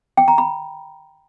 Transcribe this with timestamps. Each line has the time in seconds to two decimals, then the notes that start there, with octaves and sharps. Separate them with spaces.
0.17 G5
0.28 A#5
0.38 B5